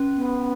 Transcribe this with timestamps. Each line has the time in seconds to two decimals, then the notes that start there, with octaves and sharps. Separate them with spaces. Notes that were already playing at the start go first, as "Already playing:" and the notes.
Already playing: C#4
0.16 B3